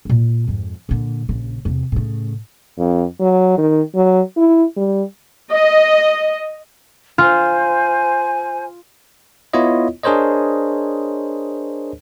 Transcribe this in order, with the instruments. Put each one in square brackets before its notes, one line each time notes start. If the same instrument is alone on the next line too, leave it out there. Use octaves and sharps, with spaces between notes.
[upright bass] A#2 E4
F2 G#2
A#2 D3
A#1 C#3
E2 C3
A2 C#3
[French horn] F2
F#3
D#3
F#3
E4
G3
[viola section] D#5
[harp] F4 [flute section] C5 G#5
[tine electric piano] B3 E4 F4 C#5 D#5
D4 G#4 A#4 C5 C#5 D#5